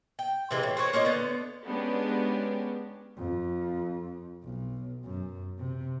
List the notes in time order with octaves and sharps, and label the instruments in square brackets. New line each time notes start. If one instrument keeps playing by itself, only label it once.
[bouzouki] G5
C3 E3 G#3 A#3
A2
C4 F#4 B4 C#5
A#3 C#4 F4 D#5
D3 B3
[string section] G#3 B3 C#4 D4 G4
[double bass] F2
B1
F#2
C3